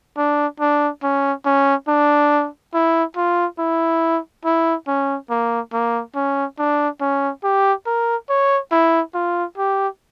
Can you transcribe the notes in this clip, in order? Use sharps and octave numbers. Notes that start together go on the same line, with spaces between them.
D4
D4
C#4
C#4
D4
E4
F4
E4
E4
C#4
A#3
A#3
C#4
D4
C#4
G4
A#4
C#5
E4
F4
G4